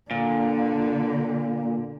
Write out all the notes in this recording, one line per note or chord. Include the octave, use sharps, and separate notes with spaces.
A#2 D3